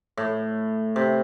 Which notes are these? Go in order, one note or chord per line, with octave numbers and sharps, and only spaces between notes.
A2
C3